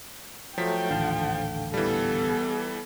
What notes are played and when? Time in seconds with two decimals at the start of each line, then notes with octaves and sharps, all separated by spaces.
0.58 F3 F#3 A3 G5 B6
0.90 D#1 A1 D3 D#3 F5 A5
1.74 E3 G3 B3 A4